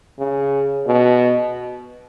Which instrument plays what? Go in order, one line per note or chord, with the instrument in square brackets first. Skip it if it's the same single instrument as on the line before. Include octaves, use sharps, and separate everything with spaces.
[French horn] C#3
B2